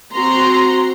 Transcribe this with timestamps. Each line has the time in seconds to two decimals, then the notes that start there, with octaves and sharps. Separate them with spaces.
0.14 C4 F#4 A#5 C6